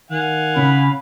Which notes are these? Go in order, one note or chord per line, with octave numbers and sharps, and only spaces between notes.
D#3 F5 F#5 G#5
C#3 B5